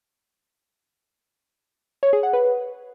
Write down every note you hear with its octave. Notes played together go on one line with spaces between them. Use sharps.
C#5
G#4
F#5
B4